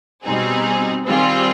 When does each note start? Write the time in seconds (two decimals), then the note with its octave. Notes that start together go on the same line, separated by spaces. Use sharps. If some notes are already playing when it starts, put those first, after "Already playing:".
0.24 B2 G3 C4 D#4 G#4
1.06 D#3 G3 C4 F4 G#4